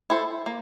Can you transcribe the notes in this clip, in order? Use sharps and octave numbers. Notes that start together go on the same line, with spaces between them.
E4 A4 C5
A#3